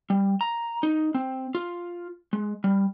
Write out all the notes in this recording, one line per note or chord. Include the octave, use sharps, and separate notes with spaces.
G3
A#5
D#4
C4
F4
G#3
G3